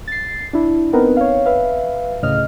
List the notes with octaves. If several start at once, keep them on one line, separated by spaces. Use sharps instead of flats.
A6 C7
D4 E4
B3 C4 D#4 A#4 B4
C#5 F5
B4 E5 F5
D2 A2 C#3 D#5 F6